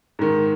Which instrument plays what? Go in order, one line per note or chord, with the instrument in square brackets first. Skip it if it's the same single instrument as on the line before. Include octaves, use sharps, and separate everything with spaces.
[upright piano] G#2 D#3